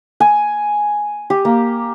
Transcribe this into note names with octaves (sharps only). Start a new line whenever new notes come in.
G#5
G4
A#3